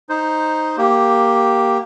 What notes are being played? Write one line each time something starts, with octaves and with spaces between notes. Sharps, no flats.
D#4 C5
A#3 G4